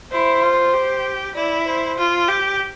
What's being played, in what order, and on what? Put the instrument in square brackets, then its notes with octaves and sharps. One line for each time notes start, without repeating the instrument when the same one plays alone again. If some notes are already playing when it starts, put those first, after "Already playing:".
[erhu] E4 [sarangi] C5
[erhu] F4
G4
[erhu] E4 [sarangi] D5
[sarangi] C5
[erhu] F4
G4